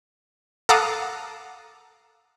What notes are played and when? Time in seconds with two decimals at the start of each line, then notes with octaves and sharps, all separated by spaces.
0.69 A4 F5 F#5 A#5 D6 D#6